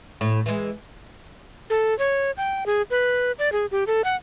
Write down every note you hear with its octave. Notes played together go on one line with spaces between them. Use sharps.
A2
E3 G#3
A4
C#5
G5
G#4
B4
D5
G#4
G4
A4
F#5